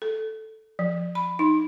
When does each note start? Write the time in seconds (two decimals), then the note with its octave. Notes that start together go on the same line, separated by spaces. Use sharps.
0.02 A4
0.79 F3
1.15 B5
1.39 D#4